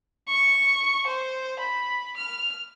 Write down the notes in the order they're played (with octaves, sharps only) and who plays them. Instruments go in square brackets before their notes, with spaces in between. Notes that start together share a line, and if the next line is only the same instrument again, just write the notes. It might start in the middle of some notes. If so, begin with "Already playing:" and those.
[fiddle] C#6
C5
B5
F6